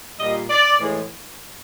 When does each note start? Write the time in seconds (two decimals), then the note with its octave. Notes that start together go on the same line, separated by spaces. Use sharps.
0.20 A#2 G3 D#5
0.50 D5
0.79 A2 E3 G#3